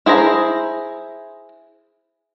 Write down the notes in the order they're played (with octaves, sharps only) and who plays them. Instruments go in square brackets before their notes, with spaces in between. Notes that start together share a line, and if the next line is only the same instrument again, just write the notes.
[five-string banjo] E4 G#4 C5 A#5